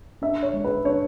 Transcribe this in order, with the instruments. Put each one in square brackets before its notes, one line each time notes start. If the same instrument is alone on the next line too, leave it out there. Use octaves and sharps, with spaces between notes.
[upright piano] D4 E5
C#5
G#3
B4
D4 C#5